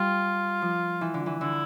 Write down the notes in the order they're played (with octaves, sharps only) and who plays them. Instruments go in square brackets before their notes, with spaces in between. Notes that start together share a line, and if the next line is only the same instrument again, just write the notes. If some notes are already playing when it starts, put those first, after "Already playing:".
Already playing: [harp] G3 [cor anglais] F4
[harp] F3
E3
D3
E3
[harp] D3 [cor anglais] E4